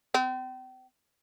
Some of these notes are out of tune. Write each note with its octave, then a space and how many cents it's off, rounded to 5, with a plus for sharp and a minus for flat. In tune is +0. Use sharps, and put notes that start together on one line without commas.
C4 -35